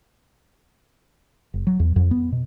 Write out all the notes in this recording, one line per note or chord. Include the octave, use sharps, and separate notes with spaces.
F#1
F#3
E2
F2
B3
B2